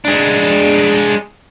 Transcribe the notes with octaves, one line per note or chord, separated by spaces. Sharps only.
G#3 D4